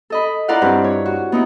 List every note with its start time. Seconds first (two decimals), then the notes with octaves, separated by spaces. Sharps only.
0.10 A4 D#5 B5
0.48 E4 F4 A#4 D5 F5 F#5
0.62 G2 C4 B4
0.84 C#5
1.06 F#4
1.32 B3 D#4 E4